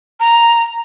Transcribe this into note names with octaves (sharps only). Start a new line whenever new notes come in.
A#5